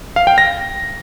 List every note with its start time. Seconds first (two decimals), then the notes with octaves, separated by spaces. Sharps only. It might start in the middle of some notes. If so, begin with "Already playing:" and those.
0.16 F5
0.27 G5
0.38 A#6